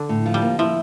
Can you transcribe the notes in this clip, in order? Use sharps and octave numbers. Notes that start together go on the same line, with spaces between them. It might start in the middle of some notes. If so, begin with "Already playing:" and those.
Already playing: D3 D4
A2
F3
G3
A#3
F3 E4